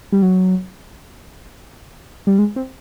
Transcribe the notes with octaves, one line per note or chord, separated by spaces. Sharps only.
G3
F#3
G3
G#3
C4